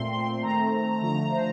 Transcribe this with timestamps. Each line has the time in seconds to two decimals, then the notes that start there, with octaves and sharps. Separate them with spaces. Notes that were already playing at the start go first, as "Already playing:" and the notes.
Already playing: A#2 A3 C4 C6
0.13 C6
0.43 D#3 A3 C4 A#5
1.01 D3 F3 A3 A#5
1.31 C5